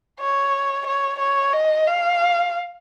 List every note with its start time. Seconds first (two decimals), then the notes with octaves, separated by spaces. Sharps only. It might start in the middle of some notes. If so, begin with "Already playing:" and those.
0.20 C#5
0.86 C#5
1.19 C#5
1.53 D#5
1.86 F5